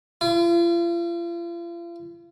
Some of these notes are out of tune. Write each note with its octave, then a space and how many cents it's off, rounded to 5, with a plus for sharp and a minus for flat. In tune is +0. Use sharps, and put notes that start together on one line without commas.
F4 -40